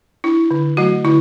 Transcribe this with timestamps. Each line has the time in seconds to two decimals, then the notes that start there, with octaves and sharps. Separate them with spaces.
0.24 D4 E4
0.51 D3
0.77 F#3 A3 F#4
1.05 D3 E4